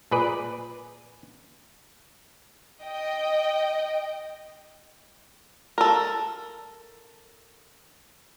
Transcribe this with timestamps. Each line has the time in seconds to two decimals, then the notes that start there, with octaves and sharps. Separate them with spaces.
0.11 A#2 G#4 B4 D5
2.83 D#5 G5
5.78 A4 A#4